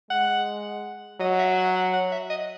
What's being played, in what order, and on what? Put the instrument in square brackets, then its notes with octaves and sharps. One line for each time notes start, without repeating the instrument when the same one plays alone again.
[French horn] G#3 [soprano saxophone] F#5
[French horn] F#3 [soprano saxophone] D#5
[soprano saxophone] E5
F#5
F#5
F#5
E5
D#5